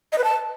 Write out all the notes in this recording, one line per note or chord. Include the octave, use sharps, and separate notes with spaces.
D#5
B4
A5